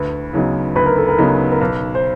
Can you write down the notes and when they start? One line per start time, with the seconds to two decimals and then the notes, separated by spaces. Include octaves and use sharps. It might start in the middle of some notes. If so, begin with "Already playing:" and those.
Already playing: D2 B4
0.33 C#3 F#3 B3 D#4
0.76 D2 B4
0.86 A#4
0.98 A4
1.09 A#4
1.18 C#3 F#3 B3 D#4
1.52 A#4
1.60 B1 B4
1.95 C5